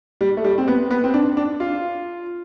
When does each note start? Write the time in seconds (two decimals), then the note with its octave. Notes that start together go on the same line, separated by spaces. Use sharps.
0.21 G3
0.37 A3
0.44 G3
0.58 C4
0.68 B3
0.91 B3
1.04 C4
1.14 D4
1.37 D4
1.60 F4